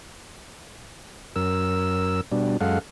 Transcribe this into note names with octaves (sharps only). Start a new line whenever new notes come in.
F#2 A#4 E6
B2 G3 D4
F#2 G#3 A4 F5 F#5